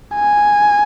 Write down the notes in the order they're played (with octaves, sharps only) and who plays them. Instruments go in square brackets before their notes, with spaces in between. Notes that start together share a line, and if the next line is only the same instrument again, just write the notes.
[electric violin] G#5